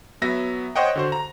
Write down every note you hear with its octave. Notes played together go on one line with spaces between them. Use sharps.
F#3 B3 E5 A#6
C5 C#5 D#5 F#5 G5
D3 F#4 C5
A#5